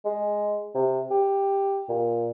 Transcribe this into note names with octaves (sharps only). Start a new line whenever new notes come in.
G#3
C3
G4
A#2